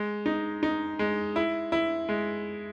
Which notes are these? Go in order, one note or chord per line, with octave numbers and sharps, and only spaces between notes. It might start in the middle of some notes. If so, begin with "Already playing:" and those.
Already playing: G#3
D#4
D#4
G#3
E4
E4
G#3